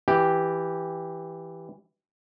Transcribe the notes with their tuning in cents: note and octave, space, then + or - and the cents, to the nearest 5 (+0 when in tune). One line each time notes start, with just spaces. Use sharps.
E3 +0 G4 +0